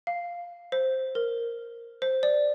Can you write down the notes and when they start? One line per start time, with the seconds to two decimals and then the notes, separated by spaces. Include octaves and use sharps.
0.07 F5
0.72 C5
1.15 A#4
2.02 C5
2.23 D5